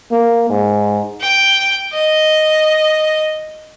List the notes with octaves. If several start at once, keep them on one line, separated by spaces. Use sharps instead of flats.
A#3
G#2
G5
D#5